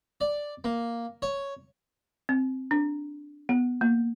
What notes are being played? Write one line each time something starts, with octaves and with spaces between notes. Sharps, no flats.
D5
A#3
C#5
C4
D4
B3
A#3